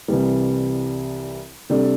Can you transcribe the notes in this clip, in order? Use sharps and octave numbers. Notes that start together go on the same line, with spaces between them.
C2 C3 E3 G3
C3 G3 D4 A4